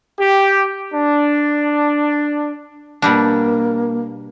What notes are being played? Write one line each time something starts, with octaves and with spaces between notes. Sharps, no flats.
G4
D4
B2 G3 A#3 D4